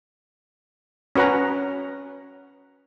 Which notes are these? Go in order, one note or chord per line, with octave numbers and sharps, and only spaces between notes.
C#4 F#4 B4 F#5 A#5